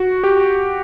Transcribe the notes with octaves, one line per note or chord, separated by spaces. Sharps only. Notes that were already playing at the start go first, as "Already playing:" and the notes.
Already playing: F#4
G4